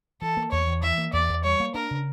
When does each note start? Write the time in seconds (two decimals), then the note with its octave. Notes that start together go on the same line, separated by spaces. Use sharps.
0.22 E3 A4
0.37 A#3
0.51 E2 C#5
0.67 E2
0.83 E3 E5
0.98 A#3
1.13 E2 D5
1.29 E2
1.44 G3 C#5
1.60 A#3
1.74 D4 A#4
1.91 C#3